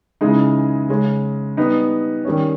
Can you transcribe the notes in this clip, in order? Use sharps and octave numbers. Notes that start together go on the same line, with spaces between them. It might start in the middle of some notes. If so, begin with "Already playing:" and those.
C#3 E3 G#3 D#4
C#3 G#3 C#4
G3 B3 D#4
D#3 G3 C#4